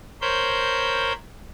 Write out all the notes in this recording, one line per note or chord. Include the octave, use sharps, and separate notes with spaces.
A#4 C5 C#5 B5 G6